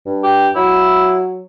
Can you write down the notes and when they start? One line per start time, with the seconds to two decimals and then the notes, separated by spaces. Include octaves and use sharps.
0.06 G2
0.24 G4
0.56 F#3 E4